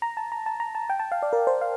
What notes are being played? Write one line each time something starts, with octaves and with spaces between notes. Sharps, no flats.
A#5
A5
A#5
A5
A#5
A5
G5
A5
F5
D5
A#4
C5
F5